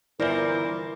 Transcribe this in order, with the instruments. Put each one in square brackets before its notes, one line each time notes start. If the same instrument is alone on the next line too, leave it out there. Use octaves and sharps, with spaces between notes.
[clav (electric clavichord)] G1 E3 [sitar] A#2 C5 [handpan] E4 D5 [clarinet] A#4